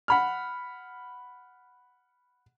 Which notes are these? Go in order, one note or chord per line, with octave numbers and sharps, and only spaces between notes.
F#5 B5 F6